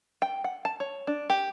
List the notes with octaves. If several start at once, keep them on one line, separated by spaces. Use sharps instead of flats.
G5
F#5
A5
C#5
D4
G4